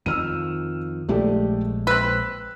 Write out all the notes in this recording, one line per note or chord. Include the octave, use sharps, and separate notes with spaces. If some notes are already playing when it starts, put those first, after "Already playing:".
F2 D#3 F3 E6 F6 D#7
A#1 G#3 A3 G4 D5
C4 B4 E6 F#6